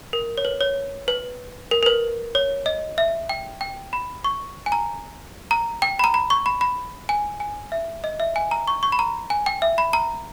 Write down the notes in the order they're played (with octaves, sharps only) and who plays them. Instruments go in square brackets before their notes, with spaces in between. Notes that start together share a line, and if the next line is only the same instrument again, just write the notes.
[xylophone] A#4
C#5
B4
C#5
B4
A#4
A#4
B4
C#5
D#5
E5
G5
G5
B5
C#6
G#5
A#5
A#5
G5
B5
A#5
B5
C#6
B5
B5
G#5
G#5
E5
D#5
E5
G#5
A#5
C#6
C#6
B5
A#5
G#5
G5
E5
B5
A#5